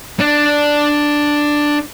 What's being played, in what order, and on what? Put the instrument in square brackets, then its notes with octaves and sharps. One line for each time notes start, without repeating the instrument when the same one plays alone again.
[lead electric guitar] D4 D5